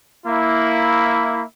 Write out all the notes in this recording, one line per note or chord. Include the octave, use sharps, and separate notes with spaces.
A#3 E4